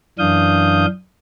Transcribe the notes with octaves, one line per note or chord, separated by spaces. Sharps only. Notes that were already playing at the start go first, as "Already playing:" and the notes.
F#2 E3 D4 F5 D#6 G6